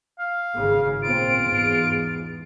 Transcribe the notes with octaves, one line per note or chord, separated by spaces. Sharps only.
F5
G#1 C#3
A#2 C4 F4 D7
E2 G#2